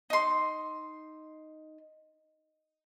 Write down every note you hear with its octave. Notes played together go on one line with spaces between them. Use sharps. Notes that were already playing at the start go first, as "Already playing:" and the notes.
D#4 C6